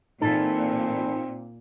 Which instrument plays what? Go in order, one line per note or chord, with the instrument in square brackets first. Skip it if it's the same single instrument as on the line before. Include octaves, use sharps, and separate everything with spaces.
[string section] A#2 [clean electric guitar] E3 A4 [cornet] C4 [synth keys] D#4